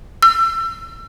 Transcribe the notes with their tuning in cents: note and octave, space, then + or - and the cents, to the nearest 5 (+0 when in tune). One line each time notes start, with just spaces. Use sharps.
E6 +30